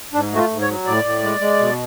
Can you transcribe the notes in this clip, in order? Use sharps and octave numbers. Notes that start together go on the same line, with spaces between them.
G#2 D4
A3 F#4
F4
G#2
C#5
F#3
A2 D5
A2
G#3
G#3
B2